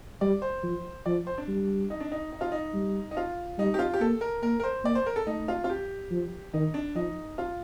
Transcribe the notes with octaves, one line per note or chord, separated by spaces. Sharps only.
G3 D5
C5
F3
F3 D5
C5
D4
G3
D#4
D4
D#4
D#4
F4
D#4
G3
D#4
F4
G3 D#4
G4
F4
G4
A#3 A4
A#4
A#3 A#4
A#4
C5
A#3 D5
C5
A#4
A4
A3 D#4
F4
F4
G4
F3
D#3 D#4
D4
F3 D#4
F4